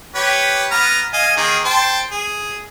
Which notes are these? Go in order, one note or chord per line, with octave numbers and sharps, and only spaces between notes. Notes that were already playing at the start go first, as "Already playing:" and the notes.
G4 B4 C#5
B3 A#5 F6
D#5 F5 G#5
D#3 A#3 G#4
C5 G5 A5
G#4